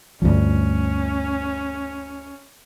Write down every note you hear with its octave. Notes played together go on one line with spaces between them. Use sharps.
D2 G2 F3 C#4